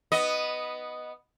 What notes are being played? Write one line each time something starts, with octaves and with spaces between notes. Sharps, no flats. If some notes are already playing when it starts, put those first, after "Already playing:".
B3 D#5